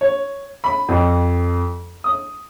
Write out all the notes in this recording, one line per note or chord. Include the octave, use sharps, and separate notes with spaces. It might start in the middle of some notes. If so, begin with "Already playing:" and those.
C#5
B5
F2
D#6